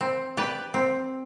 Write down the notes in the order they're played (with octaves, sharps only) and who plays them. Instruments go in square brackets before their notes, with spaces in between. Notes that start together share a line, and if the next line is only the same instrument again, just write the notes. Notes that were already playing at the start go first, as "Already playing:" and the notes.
[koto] C4
G4 B4 D5
C4